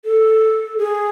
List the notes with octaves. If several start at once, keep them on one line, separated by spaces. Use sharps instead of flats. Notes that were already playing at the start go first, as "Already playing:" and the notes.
A4
G#4